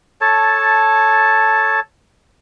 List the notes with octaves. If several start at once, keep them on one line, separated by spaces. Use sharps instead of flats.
A4 C#5 A5